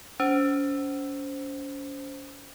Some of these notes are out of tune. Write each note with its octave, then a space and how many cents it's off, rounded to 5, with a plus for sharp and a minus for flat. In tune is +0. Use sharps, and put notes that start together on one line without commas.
C#4 +40 C5 +0